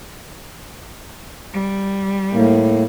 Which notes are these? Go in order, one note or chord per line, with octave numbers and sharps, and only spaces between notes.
G3
A2 A#3